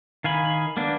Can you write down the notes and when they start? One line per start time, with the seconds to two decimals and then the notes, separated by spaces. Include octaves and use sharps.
0.24 D#3 F5 G#5 B5
0.77 A#3 B3 D4